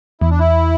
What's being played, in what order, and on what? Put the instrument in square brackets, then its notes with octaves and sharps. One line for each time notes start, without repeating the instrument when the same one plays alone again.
[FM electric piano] E2 [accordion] E4
[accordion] D4
E4